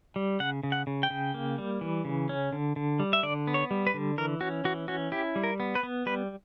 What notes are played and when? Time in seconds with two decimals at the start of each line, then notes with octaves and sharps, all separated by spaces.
0.16 G3
0.40 C#3 F#5
0.63 C#3
0.72 F#5
0.87 C#3
1.03 G5
1.10 C#3
1.34 A#3
1.58 G3
1.81 E3
2.05 C#3
2.29 C#4
2.53 D3
2.76 D3
3.00 G3
3.13 E5
3.23 D3 D5
3.47 B3
3.54 C#5
3.71 G3
3.87 B4
3.94 D3
4.18 E3 A#4
4.41 C#4 F#4
4.64 E3 F#4
4.88 C#4 F#4
5.12 E4 G4
5.36 G3
5.44 A#4
5.60 B3
5.75 B4
5.83 B3
6.06 G3 B4